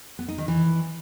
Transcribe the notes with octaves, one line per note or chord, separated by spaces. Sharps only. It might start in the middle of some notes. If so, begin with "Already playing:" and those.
B3
D#4
D#3
E3